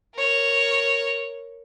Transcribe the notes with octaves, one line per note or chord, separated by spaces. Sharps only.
A#4 C#5